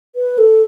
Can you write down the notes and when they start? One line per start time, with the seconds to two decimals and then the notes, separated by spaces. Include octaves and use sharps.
0.16 B4
0.38 A4